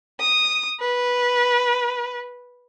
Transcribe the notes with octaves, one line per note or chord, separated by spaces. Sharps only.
D#6
B4